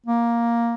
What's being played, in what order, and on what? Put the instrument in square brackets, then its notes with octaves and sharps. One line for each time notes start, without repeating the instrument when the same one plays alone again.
[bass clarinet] A#3